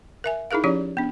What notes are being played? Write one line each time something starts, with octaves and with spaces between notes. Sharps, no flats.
A#4 E5 G#5
D#4 E4 G#4 A#4 F5
F3 C#4 E4 G4 C#5 D5
B3 D4